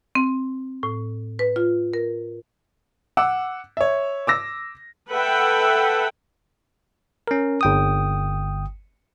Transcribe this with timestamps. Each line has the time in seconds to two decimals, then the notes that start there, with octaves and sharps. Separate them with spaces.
0.15 C4
0.83 A2
1.39 B4
1.56 F4
1.93 A#4
3.17 F#5 D6 E6
3.77 C#5 E5
4.27 D6 E6 A#6
5.10 A4 B4 E5 F#5 G5
7.28 C#4 A#4
7.61 G1 G5 D#6